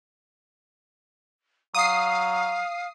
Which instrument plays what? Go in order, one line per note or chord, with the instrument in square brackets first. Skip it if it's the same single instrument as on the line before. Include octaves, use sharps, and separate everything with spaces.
[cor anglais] F#3 [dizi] F5 [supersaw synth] D#6 C7